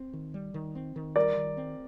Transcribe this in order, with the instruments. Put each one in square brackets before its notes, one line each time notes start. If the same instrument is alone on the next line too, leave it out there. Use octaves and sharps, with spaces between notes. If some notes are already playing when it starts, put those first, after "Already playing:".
Already playing: [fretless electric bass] C4
D#3
G3
D#3
C4
D#3
[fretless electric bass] G3 [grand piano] A#4 D5
[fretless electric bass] D#3
C4